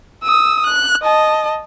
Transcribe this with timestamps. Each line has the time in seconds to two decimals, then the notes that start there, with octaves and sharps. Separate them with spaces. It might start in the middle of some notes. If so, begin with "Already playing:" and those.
0.24 D#6 E6
0.66 F#6
1.02 D#5 A5